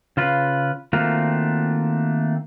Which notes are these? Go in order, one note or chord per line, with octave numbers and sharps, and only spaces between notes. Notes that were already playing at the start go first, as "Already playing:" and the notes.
C#3 F4 B4
D#3 A3 A#3 C4 F4 F#4